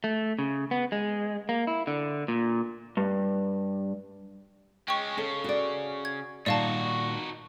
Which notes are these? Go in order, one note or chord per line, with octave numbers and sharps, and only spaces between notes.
A3
C#3
B3
G#3
A#3
E4
D3
A#2
G2
G#3 C#4 G5 C#6
C#3 A4 C#5
F#4 D5
G#6
A#2 D#3 G3 D#4 F#4 D5 F5 A5